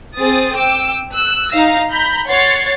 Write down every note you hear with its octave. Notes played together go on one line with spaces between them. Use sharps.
C4 G#4 D#6 A6
G5 D6 E6
E6 F#6
D#4 F5 A#6
A#5 B5 G6
C#5 F#5 C6 A6 C7